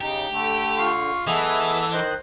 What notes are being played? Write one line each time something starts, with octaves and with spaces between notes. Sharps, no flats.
C#3 D#4 G4
D3 A3
F4 C6 C#6
E3 B3 G#4 A4 D#5 E5 E6
D#3 C5 D#5 F#6